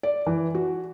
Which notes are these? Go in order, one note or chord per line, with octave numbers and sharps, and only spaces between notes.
D5
E3
F#4